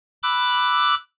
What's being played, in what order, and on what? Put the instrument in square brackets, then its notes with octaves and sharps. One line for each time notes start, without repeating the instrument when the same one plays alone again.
[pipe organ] B5 D6 E6 F#6